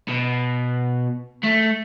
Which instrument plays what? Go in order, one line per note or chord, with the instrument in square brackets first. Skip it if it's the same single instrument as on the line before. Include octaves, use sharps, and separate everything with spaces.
[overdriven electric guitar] B2
A3